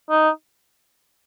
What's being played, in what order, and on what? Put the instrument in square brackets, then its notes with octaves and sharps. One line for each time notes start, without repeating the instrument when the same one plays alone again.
[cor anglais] D#4